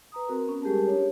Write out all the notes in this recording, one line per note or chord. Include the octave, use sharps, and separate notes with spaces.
B4 A#5 D#6
C4 F#4 A#4
B3 C#4
G3 G#3 G4 G#4 A#4 A5
D4 G4 C#5